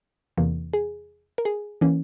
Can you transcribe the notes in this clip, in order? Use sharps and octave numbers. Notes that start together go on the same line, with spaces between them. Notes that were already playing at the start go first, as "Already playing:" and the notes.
E2 C3 E3 A#3
G#4
A#4
G#4
E3 A#3 C#4